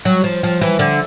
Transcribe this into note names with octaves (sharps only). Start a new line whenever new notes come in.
F#3
F3
F3
E3
D3